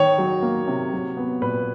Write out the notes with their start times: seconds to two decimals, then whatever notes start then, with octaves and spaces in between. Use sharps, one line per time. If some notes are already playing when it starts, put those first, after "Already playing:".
Already playing: D#3 C#5
0.18 F#3
0.42 A#3
0.68 C3
0.93 F#3
1.17 B3
1.42 A#2 B4